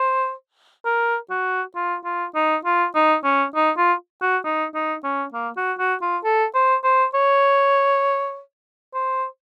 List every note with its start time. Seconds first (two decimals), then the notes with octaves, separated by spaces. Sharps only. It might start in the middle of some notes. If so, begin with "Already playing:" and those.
Already playing: C5
0.85 A#4
1.30 F#4
1.76 F4
2.04 F4
2.35 D#4
2.65 F4
2.95 D#4
3.24 C#4
3.55 D#4
3.77 F4
4.22 F#4
4.44 D#4
4.75 D#4
5.04 C#4
5.34 A#3
5.57 F#4
5.79 F#4
6.02 F4
6.24 A4
6.55 C5
6.84 C5
7.14 C#5
8.94 C5